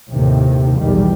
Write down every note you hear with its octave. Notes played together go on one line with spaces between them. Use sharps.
D#2 A2 C3 D#3
B1 E2 D#3 G3